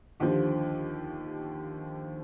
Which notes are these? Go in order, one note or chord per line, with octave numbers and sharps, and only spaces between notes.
D#2 D3 F3 G4